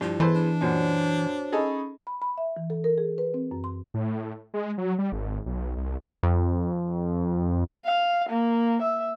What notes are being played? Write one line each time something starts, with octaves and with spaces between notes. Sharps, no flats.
G2 F3 E4
E3 B3 E4 G#4 A4 B4 C5
D4
F#2 A#2 F#4 C5 C#5
C#4 D#4 G#4 A4 B5 C#6
B5
B5
E5
E3
A4
A#4
G#4
B4
C4
F#2
C6
A2
G#3
F#3
G3
G#1
B1
C2
F2
F5
A#3
E5